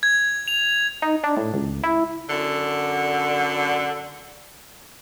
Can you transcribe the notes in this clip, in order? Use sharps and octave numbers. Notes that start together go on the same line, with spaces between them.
G#6
F7
D#4
D4
A2
C#2
E4
F#2 D3